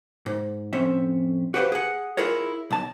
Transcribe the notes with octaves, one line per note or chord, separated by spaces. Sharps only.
G#2
F2 A2 C4 C#4 E5
F#4 G4 B4 C5 D#5 F5
G#4 F#5
E4 F4 G#4 A#4 C#5
B1 A5